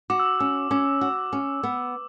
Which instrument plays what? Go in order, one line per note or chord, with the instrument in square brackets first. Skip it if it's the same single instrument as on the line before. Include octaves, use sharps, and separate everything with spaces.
[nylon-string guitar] F#4 [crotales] D6
[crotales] E6
D6
[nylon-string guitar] C#4 [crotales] E6
[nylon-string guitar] C#4 [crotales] D6
[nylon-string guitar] F#4
C#4
B3